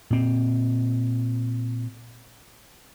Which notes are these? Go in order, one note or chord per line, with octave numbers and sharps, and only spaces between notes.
A#2 C4